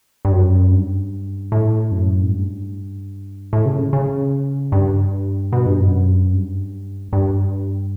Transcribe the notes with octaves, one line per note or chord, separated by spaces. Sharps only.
G2
F#2
G2
A2
F#2
A2
G2
A2
C#3
C#3
G2
B2
G2
F#2
G2
G2